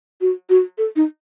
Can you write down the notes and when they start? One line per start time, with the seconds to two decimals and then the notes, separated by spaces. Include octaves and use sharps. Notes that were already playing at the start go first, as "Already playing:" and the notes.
0.21 F#4
0.50 F#4
0.78 A4
0.96 D#4